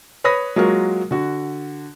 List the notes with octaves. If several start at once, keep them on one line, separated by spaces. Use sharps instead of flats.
B4 C#5 B5 D#6 A#6
F#3 G#3 A#3 F4 F#4 A#4
D3 F#4